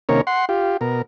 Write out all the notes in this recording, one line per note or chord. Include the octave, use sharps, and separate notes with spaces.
C3 D#3 A#3 C#4 A#4 C#5
F#5 C6
F4 G4
B2 A#4